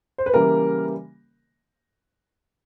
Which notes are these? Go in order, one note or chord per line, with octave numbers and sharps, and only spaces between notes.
C5
B4
C#3 E3 G3 A#3 A#4